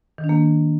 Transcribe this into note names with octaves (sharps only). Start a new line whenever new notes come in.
D#3
D4
A#3